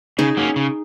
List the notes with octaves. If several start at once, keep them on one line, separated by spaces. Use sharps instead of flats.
C#3 D#4 G#4
F#3 A#3 C#4
C#3